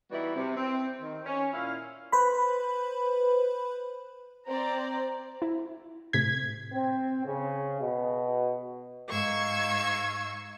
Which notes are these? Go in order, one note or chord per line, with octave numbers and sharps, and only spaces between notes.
E3 G3 B3 D#4 E4 F#4
C3
C4
D#3
C#4
A#2 E4 F5
B4 C5 B5
C4 C5 D5 A#5
E4
A2 C3 G#6 B6
C4
C#3
B2
G#2 D#4 F5 C#6 E6 G#6